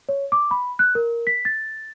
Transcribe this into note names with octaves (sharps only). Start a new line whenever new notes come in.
C#5
D6
B5
F#6
A#4
B6
A6